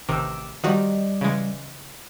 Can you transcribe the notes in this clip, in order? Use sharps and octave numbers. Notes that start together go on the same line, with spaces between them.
A1 C3 D#3 D6 E6
D#3 F3 G3 F#4 D5 D#5
C#3 E3 G#3